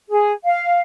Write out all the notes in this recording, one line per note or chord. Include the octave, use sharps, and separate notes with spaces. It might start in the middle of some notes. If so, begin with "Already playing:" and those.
G#4
F5